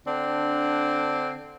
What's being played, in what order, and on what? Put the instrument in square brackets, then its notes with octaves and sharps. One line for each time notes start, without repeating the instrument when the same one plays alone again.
[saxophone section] D3 C4 D4